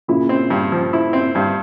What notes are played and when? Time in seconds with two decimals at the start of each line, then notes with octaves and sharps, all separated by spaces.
0.08 A#2 C#3 E4
0.29 C4
0.50 G2
0.72 F3
0.93 E4
1.13 C4
1.35 G2